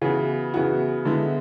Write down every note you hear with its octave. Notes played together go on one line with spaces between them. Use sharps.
C#3 E3 B3 F#4
C#3 E3 B3 F#4
D3 G#3 B3 E4